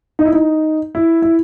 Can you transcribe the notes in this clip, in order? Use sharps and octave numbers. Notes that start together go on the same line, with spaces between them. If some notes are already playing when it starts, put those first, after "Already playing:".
D#4
E4
D#4
E4
E4